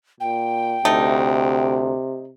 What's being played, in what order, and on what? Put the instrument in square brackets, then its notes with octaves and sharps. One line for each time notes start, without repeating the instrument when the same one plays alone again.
[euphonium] A#2 [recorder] G5
[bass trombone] D2 [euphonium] C3 [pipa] A3 D#4